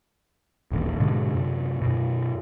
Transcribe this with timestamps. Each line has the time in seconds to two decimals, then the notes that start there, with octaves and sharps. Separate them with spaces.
0.72 D#1 A1 D#2
1.00 G#2 B2 D3 G#3
1.33 F#2 C3
1.82 F#2 B2